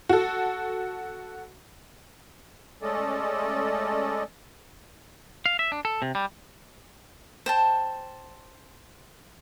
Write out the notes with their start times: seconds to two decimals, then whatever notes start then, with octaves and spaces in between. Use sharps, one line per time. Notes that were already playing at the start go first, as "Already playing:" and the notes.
0.09 F#4 A4
2.82 G#3 A3 C#4 A4 D5 D#5
5.46 F5
5.59 E5
5.72 D4
5.85 A4
6.02 C3
6.15 G3
7.46 C5 G5 A5